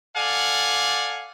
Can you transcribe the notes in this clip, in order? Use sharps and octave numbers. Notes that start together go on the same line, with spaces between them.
A4 D5 F5 F#5 G#5